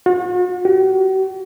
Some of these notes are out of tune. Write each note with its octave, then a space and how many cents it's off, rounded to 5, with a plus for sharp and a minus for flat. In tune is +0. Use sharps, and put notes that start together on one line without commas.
F#4 -45
F#4 +45